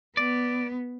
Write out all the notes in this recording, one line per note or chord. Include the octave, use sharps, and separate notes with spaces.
B3 D5